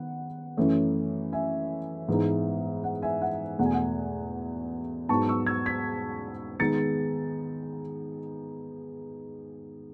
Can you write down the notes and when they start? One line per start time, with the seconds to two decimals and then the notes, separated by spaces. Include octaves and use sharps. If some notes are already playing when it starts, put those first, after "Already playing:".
Already playing: D#3 B3 F#5
0.57 F#2 E3 A3 C#4
1.32 E5 G#5
2.08 G#2 E3 G#3 B3 D#4
2.84 F#5
3.02 E5 G#5
3.22 F#5
3.58 E2 B2 A3 F#5
3.65 G#5
3.73 F#5
5.09 G#2 F#3 B3 D#4 A5 C#6
5.28 C#6 E6
5.47 E6 G#6
5.66 G#6 B6
6.60 D#3 G#3 B3 D#4 A6 C#7